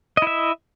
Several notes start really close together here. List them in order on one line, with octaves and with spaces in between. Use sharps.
D#5 E4 E5